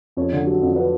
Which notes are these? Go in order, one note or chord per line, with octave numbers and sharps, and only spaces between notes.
F2 C#5
D3
F#3
F2
B4